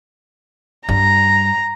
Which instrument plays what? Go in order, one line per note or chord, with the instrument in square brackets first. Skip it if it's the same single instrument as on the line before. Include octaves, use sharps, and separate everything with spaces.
[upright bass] G2 G3 [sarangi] A#5